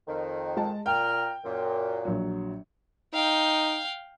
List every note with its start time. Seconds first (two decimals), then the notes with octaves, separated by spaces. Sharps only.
0.07 F2 D#3
0.57 G#3 A5
0.86 A#2 G5 A#5 F6
1.44 F#2 A#2
2.05 A#1 F#3
3.14 D#4 F5 G5